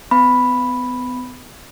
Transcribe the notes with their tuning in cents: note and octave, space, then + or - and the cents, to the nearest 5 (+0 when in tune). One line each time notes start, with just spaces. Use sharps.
B3 +35 B5 +0